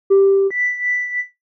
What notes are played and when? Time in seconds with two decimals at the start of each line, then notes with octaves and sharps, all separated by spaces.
0.10 G4
0.51 B6